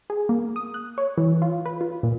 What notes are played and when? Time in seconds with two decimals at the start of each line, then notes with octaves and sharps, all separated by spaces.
0.10 G#4
0.29 A#3
0.56 D#6
0.74 F#6
0.98 C#5
1.18 E3
1.42 F4
1.66 B4
1.81 F4
2.03 A#2